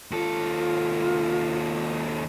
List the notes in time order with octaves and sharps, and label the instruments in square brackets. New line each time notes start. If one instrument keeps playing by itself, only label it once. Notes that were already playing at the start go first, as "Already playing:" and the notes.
[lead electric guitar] D#2 A4 [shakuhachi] F4